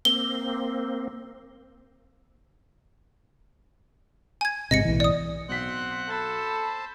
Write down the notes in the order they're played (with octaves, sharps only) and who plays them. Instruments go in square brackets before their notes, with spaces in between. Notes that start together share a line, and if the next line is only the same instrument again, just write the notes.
[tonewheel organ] A#3 C4 [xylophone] G7
[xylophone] G#5 G#6
[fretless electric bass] A1 G#2 C3 [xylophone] D#5 A#6 C#7
[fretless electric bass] B1 A2 E3
[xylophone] D5 D#6
[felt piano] B1 B6 [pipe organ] C4 F#5 F#6 [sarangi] C6
[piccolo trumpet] A4 [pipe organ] C5 A5 [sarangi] B5